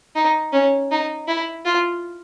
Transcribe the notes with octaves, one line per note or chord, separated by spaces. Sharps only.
D#4
C#4
D#4
E4
F4